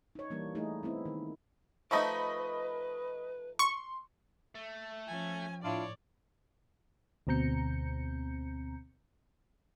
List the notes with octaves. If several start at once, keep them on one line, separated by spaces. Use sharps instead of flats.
D#4 C#5
E3 G3 A#3 D4
A3 D#4 E4 G#4
B3 C4 E4
D#3
F3 A3 D#4 B4 D#5 B5 C#6
C6 C#6
A3
F3 C#4 G#5
A2 D4 E4 F4 C#5 D5
D2 B2 C4 A#5 G6 C#7